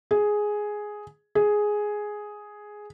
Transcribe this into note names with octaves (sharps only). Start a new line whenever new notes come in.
G#4
G#4